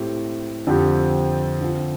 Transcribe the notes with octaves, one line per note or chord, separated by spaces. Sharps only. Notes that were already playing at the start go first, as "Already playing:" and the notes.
Already playing: A2 A3 C4 G4
F2 D3 F3 C4 G4
D3 F3 C4